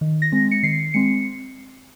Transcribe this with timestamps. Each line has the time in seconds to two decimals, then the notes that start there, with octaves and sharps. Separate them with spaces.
0.01 D#3
0.22 A#6
0.32 G#3 C4
0.51 C#7
0.63 D#3 C7
0.94 G#3 C4 C#7